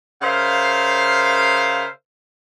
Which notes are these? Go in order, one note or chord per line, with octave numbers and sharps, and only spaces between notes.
C#3 A#4 C5 E5 F5